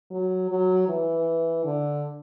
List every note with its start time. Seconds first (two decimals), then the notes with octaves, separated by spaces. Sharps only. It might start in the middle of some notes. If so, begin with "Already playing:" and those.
0.11 F#3
0.50 F#3
0.88 E3
1.64 D3